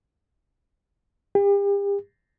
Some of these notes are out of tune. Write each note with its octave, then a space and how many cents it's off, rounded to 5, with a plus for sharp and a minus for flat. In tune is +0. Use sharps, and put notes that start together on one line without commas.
G4 +40